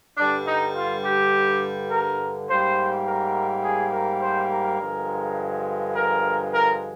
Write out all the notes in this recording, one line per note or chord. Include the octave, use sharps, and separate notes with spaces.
G2 D3 G3 D4
D#4
F4
G4
A#4
G#2 G3 A#3 C5
A#4
G#4
A#4
C5
A#4
G2 D3 F3 G#3
A#4
A#4